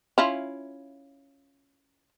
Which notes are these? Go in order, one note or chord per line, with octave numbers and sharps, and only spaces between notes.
C#4 E4 F4